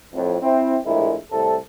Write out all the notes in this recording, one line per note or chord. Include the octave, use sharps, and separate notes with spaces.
F2 A2
C4 E4
A#1 A2 G#3 A#3 E4 A#4
C2 A2 C3 A4